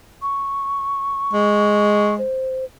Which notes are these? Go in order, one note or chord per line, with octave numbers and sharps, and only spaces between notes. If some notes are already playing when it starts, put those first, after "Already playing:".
C#6
G#3
C5